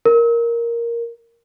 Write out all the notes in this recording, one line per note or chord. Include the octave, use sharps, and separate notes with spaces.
A#4